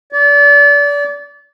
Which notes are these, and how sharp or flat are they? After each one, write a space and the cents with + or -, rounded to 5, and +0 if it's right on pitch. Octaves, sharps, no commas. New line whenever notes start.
D5 -30